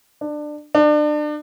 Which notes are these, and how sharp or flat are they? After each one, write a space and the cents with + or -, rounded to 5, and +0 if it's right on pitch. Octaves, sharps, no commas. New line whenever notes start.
D4 +20
D4 +30